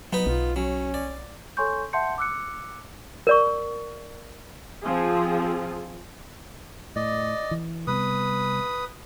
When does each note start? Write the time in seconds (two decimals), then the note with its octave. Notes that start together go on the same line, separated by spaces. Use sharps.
0.13 F#3 B3 D#4 B4
0.26 B1 F4
0.56 F#3 C#4
0.94 D5
1.57 A4 C#5 G#5 C6 C#6 G6
1.93 E5 F#5 A5 C6 G6 C#7
2.18 D6 E6 F#6 C#7
3.27 A#4 D5 C#6
4.83 F3 C4 G#4
6.96 A2 D5 D#5
7.51 E3
7.87 C3 G3 B3 B4 D#6